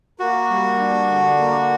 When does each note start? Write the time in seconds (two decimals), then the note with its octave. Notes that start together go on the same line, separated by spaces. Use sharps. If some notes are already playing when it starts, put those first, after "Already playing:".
0.20 A#3 F#4
0.50 G3
0.79 D4
1.08 D3
1.39 A#3